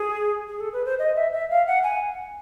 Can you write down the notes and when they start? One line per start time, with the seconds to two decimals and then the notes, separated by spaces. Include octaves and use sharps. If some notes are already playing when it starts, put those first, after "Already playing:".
Already playing: G#4
0.48 G#4
0.60 A4
0.73 B4
0.85 C5
0.99 D#5
1.16 E5
1.33 E5
1.50 F5
1.67 F#5
1.83 G#5